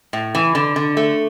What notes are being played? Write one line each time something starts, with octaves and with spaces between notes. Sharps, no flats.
A2
E3
D3
D3
A3